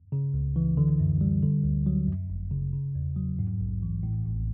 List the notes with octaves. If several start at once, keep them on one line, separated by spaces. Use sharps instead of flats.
C#3
C#2
E3
D3
F#2
G3
D3
D2
F#3
F#2
G1
C#3
C#3
E2
F#3
G#2
A#1
E3
A2
A1